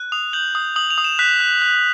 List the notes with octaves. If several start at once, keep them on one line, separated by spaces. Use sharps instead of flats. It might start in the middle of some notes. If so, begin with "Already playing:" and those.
Already playing: F#6
D#6 F7
G6 F#7
D#6
D#6 F#7
F7
D#6
E7
F#6 B6
F#6
F#6